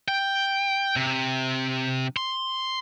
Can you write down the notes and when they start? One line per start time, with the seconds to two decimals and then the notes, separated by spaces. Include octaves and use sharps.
0.08 G5
0.96 C3
2.17 C6